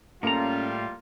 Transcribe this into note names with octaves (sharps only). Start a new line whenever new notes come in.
A2 G3 A#3 C#4 F4 A4 A#5